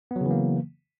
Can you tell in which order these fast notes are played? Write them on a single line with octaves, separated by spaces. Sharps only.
B3 F#3 C#3 E3 A#3